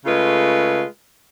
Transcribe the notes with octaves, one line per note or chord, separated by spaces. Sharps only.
C#3 G#3 A3 F4 B4